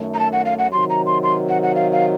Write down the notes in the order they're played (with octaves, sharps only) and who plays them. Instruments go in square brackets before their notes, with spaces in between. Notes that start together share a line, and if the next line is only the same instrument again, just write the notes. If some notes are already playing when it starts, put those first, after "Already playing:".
Already playing: [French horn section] F#2 D#3 A3
[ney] A#5
A5
F#5
F5
F#5
[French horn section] C3 D#3 F#3 [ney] C6
[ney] A#5
C6
C6
F#5
F#5
F5
F5